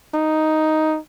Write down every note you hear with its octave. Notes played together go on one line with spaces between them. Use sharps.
D#4